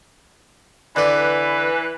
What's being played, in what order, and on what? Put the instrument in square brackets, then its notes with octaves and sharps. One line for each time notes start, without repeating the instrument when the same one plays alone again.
[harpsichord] D3 D5 [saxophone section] E3 B4